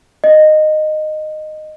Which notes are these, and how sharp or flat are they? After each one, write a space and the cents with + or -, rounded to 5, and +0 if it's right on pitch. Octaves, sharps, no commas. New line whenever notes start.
D#5 -15